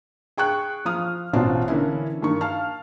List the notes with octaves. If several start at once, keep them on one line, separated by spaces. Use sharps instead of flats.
G#4 G5 C#6 F#6
F3 F5 D#6 F6
A1 B2 C4 D4 F4
D3 E3 A#3 C#4 D4 E4
G2 D#3 A#3 C#6
F5 A5 F6